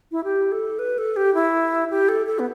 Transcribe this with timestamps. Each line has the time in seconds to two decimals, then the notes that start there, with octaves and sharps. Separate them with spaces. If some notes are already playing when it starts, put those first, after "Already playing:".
0.12 E4
0.24 G4
0.52 A4
0.79 B4
0.98 A4
1.17 G4
1.35 E4
1.90 G4
2.09 A4
2.26 A4
2.39 B3